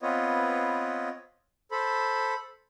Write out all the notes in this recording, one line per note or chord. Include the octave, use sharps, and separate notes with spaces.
B3 C4 F4 B4 C#5 D#5
A4 C5 B5